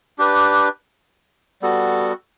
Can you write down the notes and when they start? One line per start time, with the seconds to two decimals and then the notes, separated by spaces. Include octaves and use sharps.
0.18 D4 G4 B4
1.62 G3 B3 F#4 A4